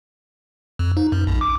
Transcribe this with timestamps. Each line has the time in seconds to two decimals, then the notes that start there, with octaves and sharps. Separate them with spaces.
0.79 F2
0.97 D#4
1.12 F#2
1.27 A#1
1.41 D6